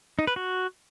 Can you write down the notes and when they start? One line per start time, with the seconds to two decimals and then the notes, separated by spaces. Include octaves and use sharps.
0.19 D#4
0.27 B4
0.36 F#4